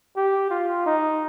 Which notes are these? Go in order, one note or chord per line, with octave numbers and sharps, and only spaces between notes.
G4
F4
D#4